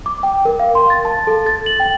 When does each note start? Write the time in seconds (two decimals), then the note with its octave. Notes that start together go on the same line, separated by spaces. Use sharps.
0.06 D6
0.23 G5
0.45 A#4
0.60 F5
0.75 C6
0.90 A6
1.05 A5
1.27 A4
1.46 A6
1.66 F#7
1.80 G5